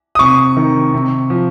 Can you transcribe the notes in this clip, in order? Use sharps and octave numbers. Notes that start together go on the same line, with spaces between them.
D#6
C3 C#6
D#3
C3
F3